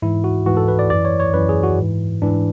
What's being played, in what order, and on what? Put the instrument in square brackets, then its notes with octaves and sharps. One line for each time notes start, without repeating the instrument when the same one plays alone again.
[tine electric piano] G#2 E3 E4
F#4
G#2 E3 F#4
A4
B4
D5
F#2 E3 D5
C#5
C#5
F#2 E3 B4
G#4
F#4
G#2 E3
G#2 E3 D4